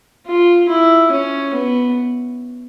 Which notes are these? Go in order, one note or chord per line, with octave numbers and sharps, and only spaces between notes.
F4
E4
C#4
B3